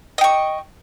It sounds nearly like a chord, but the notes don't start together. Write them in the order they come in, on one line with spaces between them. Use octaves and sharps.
D#5 G5 C#6